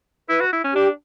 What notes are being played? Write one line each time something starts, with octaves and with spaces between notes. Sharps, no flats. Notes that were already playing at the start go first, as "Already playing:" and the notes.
E4 B4
F#4
E4
C#4
D4 G4